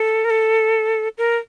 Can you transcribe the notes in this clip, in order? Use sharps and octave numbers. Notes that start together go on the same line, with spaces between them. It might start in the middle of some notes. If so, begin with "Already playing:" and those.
Already playing: A4
A#4
A4
A#4